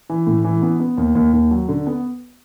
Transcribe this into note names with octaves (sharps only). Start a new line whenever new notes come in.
E3
A2
E3
B3
B3
D#2
D#2
D#2
F#3
D3
B3